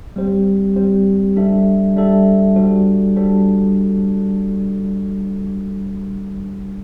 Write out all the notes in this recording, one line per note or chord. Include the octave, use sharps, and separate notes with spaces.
G3 C4 G4 C5
G3 C4 G4 C5
G3 D4 A4 E5
G3 D4 A4 E5
G3 D4 F#4 A4 C5
G3 D4 F#4 A4 C5